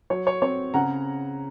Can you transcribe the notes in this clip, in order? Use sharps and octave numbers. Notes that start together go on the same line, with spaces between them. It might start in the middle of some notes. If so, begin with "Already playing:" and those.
F#3 C#5
C#5
C4 C#5
C#3 F#5 A#5